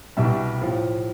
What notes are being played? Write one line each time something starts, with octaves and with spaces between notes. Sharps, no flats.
C2 B2 G3 E5
A2 F3